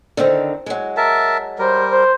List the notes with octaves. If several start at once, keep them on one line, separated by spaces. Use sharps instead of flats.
D3 D#3 C4
F#3 G#3
A#4 E5 A5
G3 A#4 C5
C5